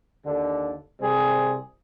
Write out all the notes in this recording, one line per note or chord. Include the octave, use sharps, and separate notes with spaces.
D#2 D3
C2 C3 G3 G#4 C5